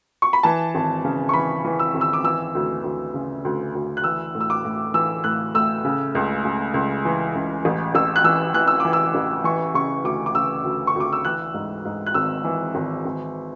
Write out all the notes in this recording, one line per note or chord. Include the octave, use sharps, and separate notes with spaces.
C#6
B5
E3 A5
G#1
C#3
C#6
E3 B5
E3
E6
G#1
E6
D6
E3 E6
D2
D2
C#3
D2
D2
F#6
E3 E6
A2
E6
D6
A2
E3 E6
A2 F#6
A2 E6
C#3
C#2
C#3
C#2
E3
C#2
A1
A1 E6
F#6
E3 E6
E3 F#6
E6
E3 D6
E6
A1
E3 C#6
C#3 C#6
D2 D6
D6
C#3 E6
D2
C#6
D2 D6
E6
E3 F#6
G#2
G#2
F#6
G#1 E6
E3
G#1
G#1